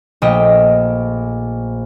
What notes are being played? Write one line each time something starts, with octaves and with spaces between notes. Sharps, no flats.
A#1 A3 D#5 G5 B6